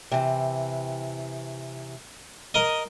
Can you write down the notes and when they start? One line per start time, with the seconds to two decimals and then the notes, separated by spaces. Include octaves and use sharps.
0.12 C3 E3
2.54 A#4 D#5